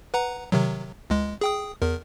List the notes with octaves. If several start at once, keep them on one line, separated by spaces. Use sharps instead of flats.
B4 F#5 A#5
C3 D#3 F#3
C#2 G#3
G#4 G5 D#6
E2 A#4